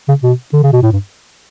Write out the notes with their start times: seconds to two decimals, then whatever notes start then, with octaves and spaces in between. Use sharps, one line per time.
0.08 C#3
0.23 B2
0.53 D3
0.63 C#3
0.73 B2
0.83 A2
0.93 G2